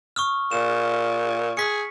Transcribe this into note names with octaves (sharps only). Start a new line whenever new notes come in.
C#6 D#6 F6
A#2 E7
G#4 B6 C#7